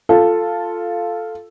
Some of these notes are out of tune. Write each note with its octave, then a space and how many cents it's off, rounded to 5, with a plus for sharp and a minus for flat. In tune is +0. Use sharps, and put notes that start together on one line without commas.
F4 +0 A4 +0